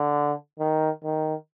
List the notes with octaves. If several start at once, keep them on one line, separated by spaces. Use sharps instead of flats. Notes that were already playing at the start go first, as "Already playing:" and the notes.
Already playing: D3
D#3
D#3